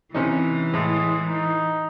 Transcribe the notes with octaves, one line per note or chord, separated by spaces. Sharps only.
C3 E3 C#4 D#4
A2 G#3
D#4